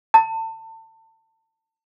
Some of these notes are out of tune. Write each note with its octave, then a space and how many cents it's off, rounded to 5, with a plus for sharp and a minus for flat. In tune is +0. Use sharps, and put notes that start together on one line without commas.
A5 +30